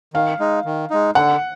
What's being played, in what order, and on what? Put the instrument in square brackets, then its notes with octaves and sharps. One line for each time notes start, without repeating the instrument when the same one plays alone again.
[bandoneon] D#3 [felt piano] F5
[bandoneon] G#3 D#4
D#3
G#3 D#4
[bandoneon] D3 [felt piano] F#5